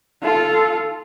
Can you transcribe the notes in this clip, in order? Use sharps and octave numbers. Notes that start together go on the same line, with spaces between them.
F4 A4